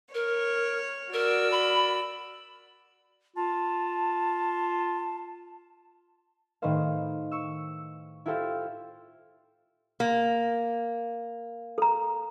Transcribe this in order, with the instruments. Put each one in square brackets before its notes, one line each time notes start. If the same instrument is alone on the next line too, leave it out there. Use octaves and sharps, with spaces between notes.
[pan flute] A#4 [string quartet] C#5
[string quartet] F#4 D5 E6 [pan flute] A#4
[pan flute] B5
[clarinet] F4 [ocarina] A5
[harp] A2 D#3 D#4 B4 C5 F5
C#6 E6
E4 F4 G4 A4 C5 F5
[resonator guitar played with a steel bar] A#3
[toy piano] A4 A#5